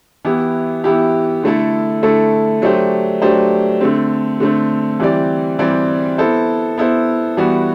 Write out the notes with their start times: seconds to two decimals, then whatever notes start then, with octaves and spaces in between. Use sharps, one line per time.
0.25 E3 B3 E4 G4
0.84 E3 B3 E4 G4
1.43 D3 A3 E4 A4
2.03 D3 A3 E4 A4
2.62 F#3 A3 D4 G4 C5
3.22 F#3 A3 D4 G4 C5
3.81 D3 A3 C4
4.40 D3 A3 C4
5.00 E3 G3 C4 G4 D5
5.59 E3 G3 C4 G4 D5
6.18 B3 E4 A4 C5
6.78 B3 E4 A4 C5
7.37 E3 G3 B3 F#4